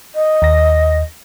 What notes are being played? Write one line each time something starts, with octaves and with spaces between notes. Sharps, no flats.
D#5
D#2 A#6